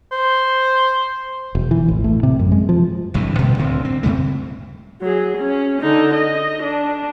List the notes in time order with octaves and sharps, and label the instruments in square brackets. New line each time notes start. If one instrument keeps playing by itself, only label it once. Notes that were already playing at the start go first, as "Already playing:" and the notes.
[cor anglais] C5
[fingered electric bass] E1
E3
A1
A2
C3
F#2
G#3
F3
[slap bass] G#1 G2 C3 E3
A#2 D3 G3 A3
D1 D2 D3 C4
C4
F#2 C#3 G3 A3
[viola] F#3 G#4
C#4
D3 D#4
D#5
D4